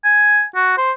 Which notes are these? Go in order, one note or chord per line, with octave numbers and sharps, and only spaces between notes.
G#5
F#4
C5